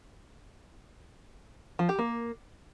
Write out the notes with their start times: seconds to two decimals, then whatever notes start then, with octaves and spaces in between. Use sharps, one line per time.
1.79 F3
1.89 G4
1.99 A#3